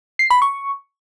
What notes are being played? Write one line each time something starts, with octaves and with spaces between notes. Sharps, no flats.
C7
B5
C#6